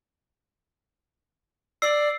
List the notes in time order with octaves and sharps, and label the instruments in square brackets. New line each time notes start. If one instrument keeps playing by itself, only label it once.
[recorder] D5 [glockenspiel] E6 C7